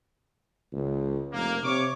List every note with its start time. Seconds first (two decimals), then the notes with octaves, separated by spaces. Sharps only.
0.73 C#2
1.32 F1 A#3
1.63 C3 C#5 C#6 D6